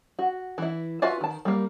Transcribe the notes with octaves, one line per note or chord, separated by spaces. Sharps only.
F#4
E3 E4
F4 F#4 B4 E5 G#5
D#3 A5
G3 A#3